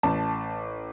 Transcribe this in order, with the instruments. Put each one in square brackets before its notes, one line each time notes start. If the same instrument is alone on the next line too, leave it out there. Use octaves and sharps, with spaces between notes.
[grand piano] A1 [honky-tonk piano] A5